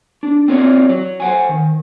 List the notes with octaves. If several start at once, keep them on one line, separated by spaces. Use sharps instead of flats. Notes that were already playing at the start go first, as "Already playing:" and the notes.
D4
C4 E4 F4 A#4 C#5 D5
F#3
C5 F#5 G#5
D#3